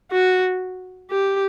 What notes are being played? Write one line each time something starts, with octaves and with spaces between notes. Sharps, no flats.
F#4
G4